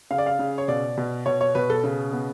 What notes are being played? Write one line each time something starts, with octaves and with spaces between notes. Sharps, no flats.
C#3 F5
D5
F5
C#3
C#5
B2 D5
B2
B2 C#5
C#5
B2 B4
A4
C#3
B3